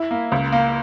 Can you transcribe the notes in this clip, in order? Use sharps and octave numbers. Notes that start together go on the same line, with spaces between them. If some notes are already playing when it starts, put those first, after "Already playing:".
Already playing: E4
A#3
C#2
A#3